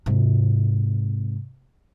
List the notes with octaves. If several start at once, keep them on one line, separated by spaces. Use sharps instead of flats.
G#2 C3